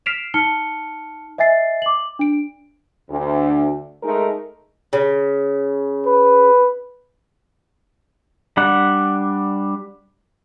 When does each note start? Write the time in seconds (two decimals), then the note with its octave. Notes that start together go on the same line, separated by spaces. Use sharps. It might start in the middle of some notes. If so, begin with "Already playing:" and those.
0.06 F6 B6 C7 D7 E7 F7
0.34 D#4 A5 F6 C#7 G7
1.38 D#5 E5 G#5 A6 C7
1.82 D6 F#7
2.19 D4 D7
3.10 D2
4.03 G#3 A3 D#4 G#4 A#4
4.93 C#3
6.06 B4
8.57 G3 D4 F#5